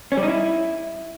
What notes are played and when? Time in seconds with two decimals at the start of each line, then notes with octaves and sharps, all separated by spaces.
0.12 C#4
0.17 G3
0.23 D#4
0.28 E4